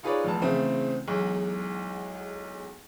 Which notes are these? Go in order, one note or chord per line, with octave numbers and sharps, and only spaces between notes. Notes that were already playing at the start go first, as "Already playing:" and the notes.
D#4 F4 G#4 B4 C#5 D5
F1 E2 A5
E2 C#3 A3 C4
B1 E2 G#3